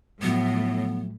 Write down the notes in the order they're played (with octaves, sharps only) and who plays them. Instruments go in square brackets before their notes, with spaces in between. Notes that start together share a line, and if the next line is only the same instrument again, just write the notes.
[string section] A2 [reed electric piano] F3 F#3 A3 [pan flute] B3